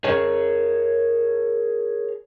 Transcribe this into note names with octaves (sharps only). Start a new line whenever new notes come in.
G#4 A#4 C#5